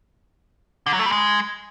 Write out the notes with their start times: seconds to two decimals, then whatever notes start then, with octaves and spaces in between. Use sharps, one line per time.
0.86 D3
0.93 F#3
0.99 A3
1.06 G3
1.12 G#3